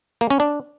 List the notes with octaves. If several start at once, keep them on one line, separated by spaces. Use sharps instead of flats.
A#3
C#4
D4